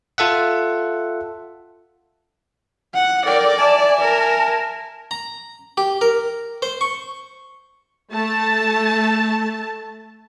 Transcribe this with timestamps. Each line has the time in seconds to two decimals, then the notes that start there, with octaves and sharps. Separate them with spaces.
0.18 F4 A4 E5 F#5
2.95 F#5
3.26 A4 A#4 D5 G5
3.59 E5 G#5 A5
4.01 A#4
5.11 A#5
5.77 G4
6.01 A#4
6.62 C5
6.81 C#6
8.13 A3 A5